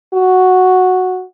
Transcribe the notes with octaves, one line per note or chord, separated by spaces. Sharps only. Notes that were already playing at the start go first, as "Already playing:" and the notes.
F#4